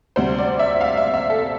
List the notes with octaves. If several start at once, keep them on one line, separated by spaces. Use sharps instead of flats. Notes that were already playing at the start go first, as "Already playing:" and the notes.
D2 C3 G3 C5
D5
E5
F5
E5
E5
A4